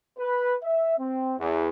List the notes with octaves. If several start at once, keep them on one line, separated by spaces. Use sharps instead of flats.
B4
E5
C4
E2